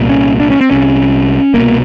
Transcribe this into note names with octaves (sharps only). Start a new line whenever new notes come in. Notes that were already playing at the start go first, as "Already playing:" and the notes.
Already playing: C2 A#2
C#4
D4
C#4
C4
C2 C3 C#4
C2 B2 A#3